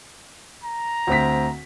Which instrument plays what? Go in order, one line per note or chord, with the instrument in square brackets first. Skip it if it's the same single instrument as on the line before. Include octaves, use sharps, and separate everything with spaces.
[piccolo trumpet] A#5
[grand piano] D2 C4 B6